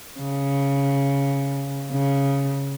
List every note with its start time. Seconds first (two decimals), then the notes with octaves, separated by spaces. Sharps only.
0.20 C#3
1.92 C#3